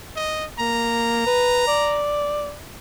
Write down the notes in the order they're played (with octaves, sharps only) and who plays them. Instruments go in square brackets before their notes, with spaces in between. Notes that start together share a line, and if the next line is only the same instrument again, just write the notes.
[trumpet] D#5
[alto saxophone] A#3 [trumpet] A#5
[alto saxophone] B4
D5